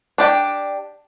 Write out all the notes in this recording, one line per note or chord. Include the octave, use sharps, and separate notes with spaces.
D4 G4 G5